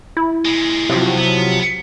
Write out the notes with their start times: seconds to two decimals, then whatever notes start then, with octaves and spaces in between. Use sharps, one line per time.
0.17 E4
0.45 A#2 G#3
0.89 G2 C3 F3 F#3
1.18 B3